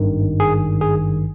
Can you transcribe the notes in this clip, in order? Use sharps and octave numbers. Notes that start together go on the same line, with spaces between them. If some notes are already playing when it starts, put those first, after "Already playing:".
Already playing: G#1 G2 D#3
G#4
G#4